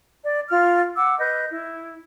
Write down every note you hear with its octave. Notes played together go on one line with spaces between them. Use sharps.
D5
F4 F6
F#5 D6 E6
B4 D#5 G6
E4